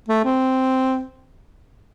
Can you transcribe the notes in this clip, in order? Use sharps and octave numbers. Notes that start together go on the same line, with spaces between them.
A3
C4